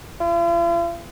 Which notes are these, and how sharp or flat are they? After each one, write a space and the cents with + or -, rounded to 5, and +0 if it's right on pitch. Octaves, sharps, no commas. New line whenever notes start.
F4 -45